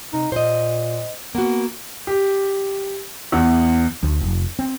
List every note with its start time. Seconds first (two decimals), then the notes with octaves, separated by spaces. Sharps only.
0.13 C3 D#4
0.32 A#2 C5 D#5
1.35 A#3 B3 F#4
2.07 G4
3.32 E2
4.03 D2
4.21 F1
4.59 C4